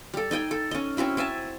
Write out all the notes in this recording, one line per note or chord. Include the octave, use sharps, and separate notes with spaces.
G3 A4
D#4 D#5 G5 G#5
A4
C#4 D#5
C4 C#4 E4 F#4
C4 E5 G#5 A5